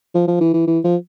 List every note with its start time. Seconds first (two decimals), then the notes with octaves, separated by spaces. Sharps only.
0.15 F3
0.28 F3
0.40 E3
0.53 E3
0.67 E3
0.84 F3